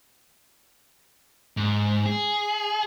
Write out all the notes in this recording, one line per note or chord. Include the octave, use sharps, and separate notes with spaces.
G#2
G#4